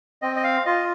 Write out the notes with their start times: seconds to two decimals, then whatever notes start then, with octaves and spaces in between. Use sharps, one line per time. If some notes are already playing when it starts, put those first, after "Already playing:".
0.22 C4 D#5
0.36 D#5
0.44 F5
0.66 F4 D#5